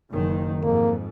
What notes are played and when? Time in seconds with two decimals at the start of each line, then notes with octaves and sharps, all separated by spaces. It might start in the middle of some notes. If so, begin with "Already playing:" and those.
0.10 F#1 F#2 D#3
0.63 F2 G#2 A#3